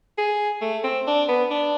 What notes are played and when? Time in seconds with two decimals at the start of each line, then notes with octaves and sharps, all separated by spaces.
0.18 G#4
0.62 A3
0.84 C4
1.07 D4
1.28 B3
1.50 D4